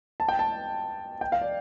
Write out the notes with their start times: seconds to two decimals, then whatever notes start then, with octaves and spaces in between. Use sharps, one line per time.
0.20 A5
0.29 G5
0.39 A5
1.21 G5
1.32 F5
1.41 D5